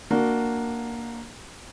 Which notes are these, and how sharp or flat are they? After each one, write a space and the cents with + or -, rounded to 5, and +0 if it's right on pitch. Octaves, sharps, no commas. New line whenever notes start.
A#3 +0 D4 +0 F#4 +0